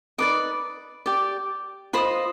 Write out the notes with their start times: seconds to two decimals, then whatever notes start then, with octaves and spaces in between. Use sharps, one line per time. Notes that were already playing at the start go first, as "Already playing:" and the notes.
0.18 D#4 B4 D5 D6
1.06 G4 D5
1.93 F4 C5 D#5 B5